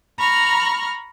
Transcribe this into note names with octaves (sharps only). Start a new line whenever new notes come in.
A#5 B5 C#6 F6